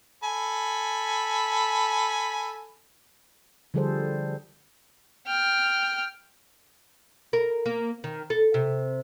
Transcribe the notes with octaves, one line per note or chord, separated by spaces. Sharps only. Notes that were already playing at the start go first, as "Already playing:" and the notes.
A4 G#5 B5
D3 F3 G3 G#4 A4 C5
G5 F6
A#4
A#3
D#3
A4
C3